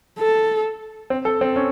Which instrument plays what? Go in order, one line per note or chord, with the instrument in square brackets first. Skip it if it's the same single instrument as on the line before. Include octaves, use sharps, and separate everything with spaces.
[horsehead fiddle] A4
[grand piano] C4
A4
C4
C#4